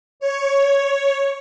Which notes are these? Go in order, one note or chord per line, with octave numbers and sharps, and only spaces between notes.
C#5